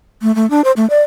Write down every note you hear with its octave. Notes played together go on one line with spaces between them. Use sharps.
A3
A3
D4
C5
A3
D5